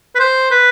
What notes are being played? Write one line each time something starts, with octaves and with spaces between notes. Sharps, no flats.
B4
C5
B4